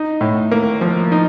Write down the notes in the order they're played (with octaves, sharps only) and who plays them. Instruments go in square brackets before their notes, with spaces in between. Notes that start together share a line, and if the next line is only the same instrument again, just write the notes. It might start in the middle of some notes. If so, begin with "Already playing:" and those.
Already playing: [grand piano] D#4
A2
A#3
F3
D#4